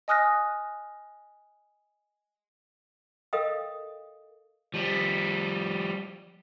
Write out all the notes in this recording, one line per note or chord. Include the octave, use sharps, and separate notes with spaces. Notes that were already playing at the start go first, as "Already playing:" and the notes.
D#5 G#5 D#6 F6 F#6 A#6
A4 A#4 D#5 F5 G5 D#6
F3 G3